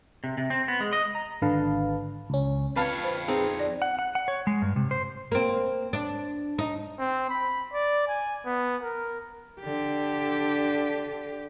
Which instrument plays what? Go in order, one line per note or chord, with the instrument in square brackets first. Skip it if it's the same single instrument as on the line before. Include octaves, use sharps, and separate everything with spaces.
[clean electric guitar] C3
C3
C4
B3
G#3
D#5
[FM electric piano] A#5
G#1 D3 B4 F5 A5
C#2 C#4
[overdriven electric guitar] F2 C#5 [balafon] C4 [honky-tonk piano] B4 F5 A5
[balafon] C5
[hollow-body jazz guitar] C4 D#4 [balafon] G#4
[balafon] D5
[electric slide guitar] F#5
F#5
F#5
C#5
G#3
G2
C3
C5
[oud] A#3 C4
D4
D#4
[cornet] C4
B5
D5
G#5
B3
A#4
[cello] D3 G4